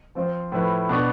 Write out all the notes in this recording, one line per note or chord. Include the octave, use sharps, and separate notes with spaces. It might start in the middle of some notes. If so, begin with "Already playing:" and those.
F3 C4 F4 C5
A2 F3 A3 E4 B4
B2 B3 D4